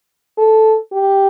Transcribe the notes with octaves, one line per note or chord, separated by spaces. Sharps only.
A4
G4